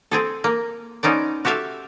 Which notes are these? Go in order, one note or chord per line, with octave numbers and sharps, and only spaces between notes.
C4 G#4 A4
A#3
B3 C#4 D#4 C5 D5
F#4 G4 A4 E5 F5